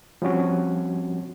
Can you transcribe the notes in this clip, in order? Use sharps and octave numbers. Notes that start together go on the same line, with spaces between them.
F3 G3 C4 C#4 F#4